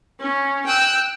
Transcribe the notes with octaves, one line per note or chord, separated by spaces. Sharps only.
C#4
G5 E6 F#6